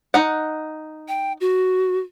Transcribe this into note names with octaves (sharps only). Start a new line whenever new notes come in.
D#4 F#5
G5
F#4